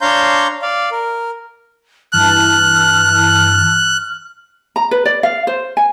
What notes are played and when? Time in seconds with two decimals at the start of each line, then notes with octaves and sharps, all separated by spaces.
0.01 D4 C#5 F5 A#5 C6 G6
0.62 D5 F5
0.91 A#4
2.13 G2 E3 A5 F6 F#6
4.76 A#5
4.91 B4
5.05 D5
5.23 F5
5.47 C5
5.77 G#5